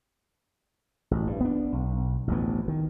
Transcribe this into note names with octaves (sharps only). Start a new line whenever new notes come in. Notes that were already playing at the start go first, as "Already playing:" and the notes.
A1
G2
B3 D4
B1
A1 D2 B3
D#3